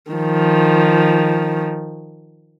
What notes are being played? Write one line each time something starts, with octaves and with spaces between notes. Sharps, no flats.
D#3 F3